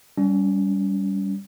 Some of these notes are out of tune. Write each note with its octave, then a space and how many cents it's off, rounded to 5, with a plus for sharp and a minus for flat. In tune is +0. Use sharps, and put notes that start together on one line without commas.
G3 +0 C#4 +35